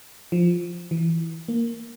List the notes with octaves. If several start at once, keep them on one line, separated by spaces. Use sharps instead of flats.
F3
E3
A#3